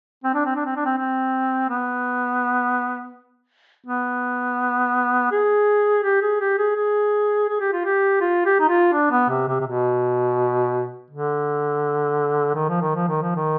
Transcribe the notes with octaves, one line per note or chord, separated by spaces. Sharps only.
C4
D4
C4
D4
C4
D4
C4
C4
B3
B3
G#4
G4
G#4
G4
G#4
G#4
G#4
G4
F4
G4
F4
G4
D#4
F4
D4
B3
C3
C3
C3
B2
D3
D#3
F3
D#3
F3
D#3
F3
D#3